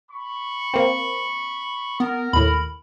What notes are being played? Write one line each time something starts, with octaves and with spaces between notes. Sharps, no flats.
B5 C#6
A#3 C4
B3 A#4
D#2 A2 B5